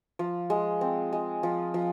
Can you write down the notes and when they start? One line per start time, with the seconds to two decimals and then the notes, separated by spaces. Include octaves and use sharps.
0.19 F3
0.50 G#3
0.81 C4
1.13 G#3
1.43 F3
1.74 F3